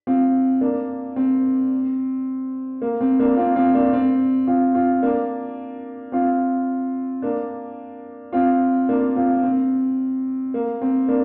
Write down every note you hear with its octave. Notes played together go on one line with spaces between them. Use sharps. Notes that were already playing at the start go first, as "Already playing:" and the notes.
C4 F4
A#3 D4
C4
A#3
C4
A#3 D4
C4 F4
C4 F4
A#3 D4
C4
C4 F4
C4 F4
A#3 D4
C4 F4
A#3 D4
C4 F4
A#3 D4
C4 F4
C4
A#3
C4
A#3 D4